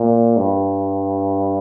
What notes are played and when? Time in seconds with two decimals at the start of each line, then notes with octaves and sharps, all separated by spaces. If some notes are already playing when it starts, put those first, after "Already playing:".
Already playing: A#2
0.37 G2